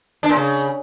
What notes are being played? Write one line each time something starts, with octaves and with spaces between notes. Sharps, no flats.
D4
A#2
C#3